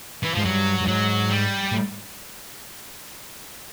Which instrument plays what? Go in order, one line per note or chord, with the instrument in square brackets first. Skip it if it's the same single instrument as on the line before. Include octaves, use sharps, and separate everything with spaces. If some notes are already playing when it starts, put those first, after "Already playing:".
[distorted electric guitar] E3
[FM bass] G#2 [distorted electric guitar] F3
[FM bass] G2 [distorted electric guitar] F#3
[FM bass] G2
[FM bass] G#2 [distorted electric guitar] F#3
[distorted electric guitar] G3
[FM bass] A2